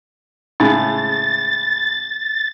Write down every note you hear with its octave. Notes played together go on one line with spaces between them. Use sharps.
A2 C#3 G#3 A6